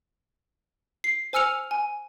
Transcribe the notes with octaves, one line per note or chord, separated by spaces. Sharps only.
C7
C5 G#5 E6 F6 C#7 F7
G#5